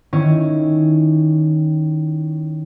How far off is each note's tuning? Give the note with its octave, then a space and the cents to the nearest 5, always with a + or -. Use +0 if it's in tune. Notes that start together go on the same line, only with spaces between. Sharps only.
D#3 +0 C#4 +0 E4 +0